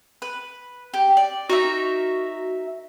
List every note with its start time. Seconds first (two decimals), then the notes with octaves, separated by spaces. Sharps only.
0.22 B4
0.94 G4
1.17 D5
1.49 D#4 F#4 A#4 E5